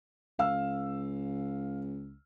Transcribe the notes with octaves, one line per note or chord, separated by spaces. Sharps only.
C#2 F5 E6